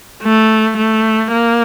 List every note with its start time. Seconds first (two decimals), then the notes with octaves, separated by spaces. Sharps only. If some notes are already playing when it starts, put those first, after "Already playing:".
0.23 A3
0.77 A3
1.32 A#3